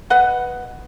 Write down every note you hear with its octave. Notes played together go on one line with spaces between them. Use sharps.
B4 D#5 F#5